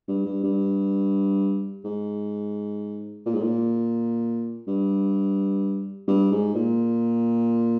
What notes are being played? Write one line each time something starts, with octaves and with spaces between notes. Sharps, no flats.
G2
G2
G2
G#2
A#2
G#2
A#2
G2
G2
G#2
A#2